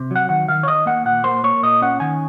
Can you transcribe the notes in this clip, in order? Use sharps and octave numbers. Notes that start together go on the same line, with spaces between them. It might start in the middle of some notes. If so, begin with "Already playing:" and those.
Already playing: C3
F#3 F#5
D#3 F#5
D#3 F5
C#5
D#3 D#5
A#3 F#5
A#2 F#5
A#3 C5
A#3 C#5
A#2 D#5
C#4 F#5
D#3 G#5